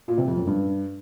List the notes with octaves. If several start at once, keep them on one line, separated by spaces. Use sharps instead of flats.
A#2
C3
F2
F#2
G2